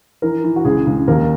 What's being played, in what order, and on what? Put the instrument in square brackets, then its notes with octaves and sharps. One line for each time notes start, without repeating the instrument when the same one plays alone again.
[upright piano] E3 A#4
E3
F#4
C#2 G#4
C#2
D#2 A#4